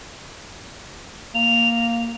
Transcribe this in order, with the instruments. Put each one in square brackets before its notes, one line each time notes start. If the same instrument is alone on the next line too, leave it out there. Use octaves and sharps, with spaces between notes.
[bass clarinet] A#3 [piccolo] F7